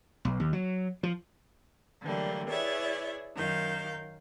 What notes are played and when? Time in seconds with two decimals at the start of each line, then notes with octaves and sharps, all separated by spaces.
0.25 B1
0.40 D#2
0.53 F#3
1.03 F3
2.01 D3 E3 F#3 G3 A3 A#3
2.49 E4 G#4 B4 C#5 D5 E5
3.36 F#2 D#3 F5 G6